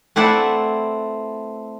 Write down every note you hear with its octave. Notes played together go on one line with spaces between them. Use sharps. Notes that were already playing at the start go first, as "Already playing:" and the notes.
A3 C4 E4 B4 D5 F#5